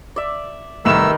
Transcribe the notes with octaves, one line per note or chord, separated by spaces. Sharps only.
D5 E5
C2 D#3 A3 A#4 B4 E6 E7